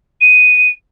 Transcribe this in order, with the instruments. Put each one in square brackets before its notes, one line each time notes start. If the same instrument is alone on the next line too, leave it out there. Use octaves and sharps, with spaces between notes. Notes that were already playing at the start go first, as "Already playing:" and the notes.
[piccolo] D#7